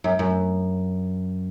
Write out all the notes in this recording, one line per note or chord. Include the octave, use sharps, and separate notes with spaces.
F#2
F#2